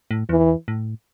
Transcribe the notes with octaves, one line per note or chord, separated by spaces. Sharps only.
A2
E2 E3
A2